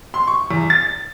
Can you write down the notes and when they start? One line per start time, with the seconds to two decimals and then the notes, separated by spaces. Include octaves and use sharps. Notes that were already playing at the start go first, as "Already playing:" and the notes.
0.14 C6
0.27 C#6
0.51 E2
0.70 A6